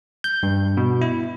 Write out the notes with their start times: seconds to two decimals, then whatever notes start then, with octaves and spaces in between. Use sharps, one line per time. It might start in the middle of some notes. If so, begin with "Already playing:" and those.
0.24 G6
0.43 G2
0.77 B2
1.01 E4